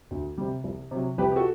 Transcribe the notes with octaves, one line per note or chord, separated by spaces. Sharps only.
D2
C3 G3
C2
C3 F#3
C2 G4 B4
G4
F#4 A4